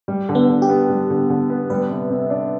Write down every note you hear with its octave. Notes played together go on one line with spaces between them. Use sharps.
G3
D3
B3
D3
G4
B3
G3
D3
D3
B3
G3 B4
C3
C3
D4